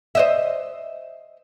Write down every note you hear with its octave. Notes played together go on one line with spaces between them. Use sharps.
C5 D#5 E5